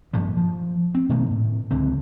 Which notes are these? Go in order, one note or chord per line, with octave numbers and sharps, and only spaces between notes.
G2 A#2 F3 G3
F3
C4
B2 D#3 A3 A#3
A2
C#2 D3 C4